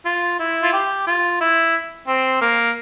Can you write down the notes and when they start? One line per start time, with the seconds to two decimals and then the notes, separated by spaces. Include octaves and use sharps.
0.05 F4
0.39 E4
0.63 F4
0.73 G4
1.07 F4
1.41 E4
2.08 C4
2.41 A#3